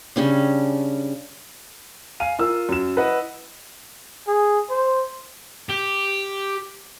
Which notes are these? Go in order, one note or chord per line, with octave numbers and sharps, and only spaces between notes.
C#3 G3 C#4 D4
F5 G#5 D#7
F4 A#4 E6
F#2 E7
E4 B4 D#5 F#5
G#4
C5
G4